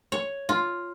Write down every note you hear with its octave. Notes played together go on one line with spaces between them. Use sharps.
C#5
F4